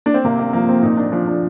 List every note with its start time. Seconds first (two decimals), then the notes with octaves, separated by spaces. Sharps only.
0.06 D4
0.14 C4
0.24 C3 A#3
0.39 A#3
0.53 F3 A#3
0.69 C4
0.83 A#2 D#4
0.97 D4
1.12 F3 D4
1.27 D4